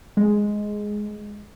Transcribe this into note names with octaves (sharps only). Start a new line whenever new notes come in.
G#3